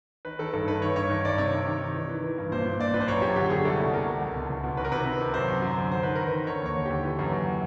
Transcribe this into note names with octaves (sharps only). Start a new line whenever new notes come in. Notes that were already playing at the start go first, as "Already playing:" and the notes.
D#3 B4
D#3 A4
G2 A4
D#3 B4
D#3 C#5
G2 C#5
D#3
G2 D5
C3 C#5
D#3
D#3
D#3
E3
E3
E3
G2
A#2 C5
A#2
A#2 D5
A#2 B4
C5
F#2 C#5
F#2 G4
D3 G4
D3 G#4
C2 A4
B2
B2 A#4
C2
C#2
B2
C#2
B2
D#3 B4
A#4
C3 B4
C3
C3
F#2 C5
F#2
F#2
D3
D#3 C5
D#3 B4
D#3 A#4
B4
D#3
D3 C#5
D#2 C#5
D#2
G4
D3
E3
F#2
F#2